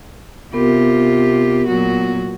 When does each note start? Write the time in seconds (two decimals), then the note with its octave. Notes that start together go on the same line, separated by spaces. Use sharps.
0.53 C3 B3 F4 G4 A#4
1.67 A#2 F#3 F#4